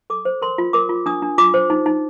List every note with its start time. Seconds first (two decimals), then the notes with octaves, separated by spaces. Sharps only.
0.10 A4 D6
0.25 C5
0.42 A#4 C6
0.58 F4
0.73 A#4 D6
0.89 F4
1.06 D4 D#6
1.22 D4
1.38 F4 D6
1.54 C5
1.70 D#4
1.86 D#4